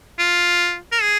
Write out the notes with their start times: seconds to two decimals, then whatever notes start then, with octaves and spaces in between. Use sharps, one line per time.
0.19 F4
0.92 A#4
1.02 G#4